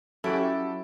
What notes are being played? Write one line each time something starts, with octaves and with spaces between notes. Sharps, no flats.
F#3 C#4 E4 F#4 G4 A4 D7